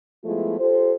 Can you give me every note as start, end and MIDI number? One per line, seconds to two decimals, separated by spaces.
0.24 0.58 53
0.24 0.58 56
0.24 0.58 57
0.24 0.58 59
0.24 0.58 64
0.24 0.58 65
0.59 0.92 65
0.59 0.92 67
0.59 0.92 69
0.59 0.92 72